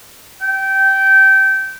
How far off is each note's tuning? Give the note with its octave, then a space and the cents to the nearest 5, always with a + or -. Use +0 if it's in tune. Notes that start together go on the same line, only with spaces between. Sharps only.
G5 -20